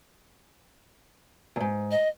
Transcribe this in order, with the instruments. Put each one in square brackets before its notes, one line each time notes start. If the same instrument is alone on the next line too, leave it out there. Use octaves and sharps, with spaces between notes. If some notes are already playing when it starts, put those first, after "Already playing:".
[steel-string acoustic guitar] E2 G#2
[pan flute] D#5